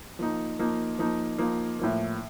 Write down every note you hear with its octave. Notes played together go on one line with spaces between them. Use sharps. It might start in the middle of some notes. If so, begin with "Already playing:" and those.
F3 A#3 D#4
F3 A#3 D#4
F3 A#3 D#4
F3 A#3 D#4
A2 F3 A#3